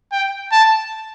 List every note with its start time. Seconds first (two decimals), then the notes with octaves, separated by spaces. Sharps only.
0.12 G5
0.51 A5